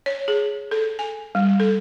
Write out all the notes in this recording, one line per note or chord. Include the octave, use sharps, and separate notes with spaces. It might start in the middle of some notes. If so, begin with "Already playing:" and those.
C#5
G#4
A4
G#5
G3
A4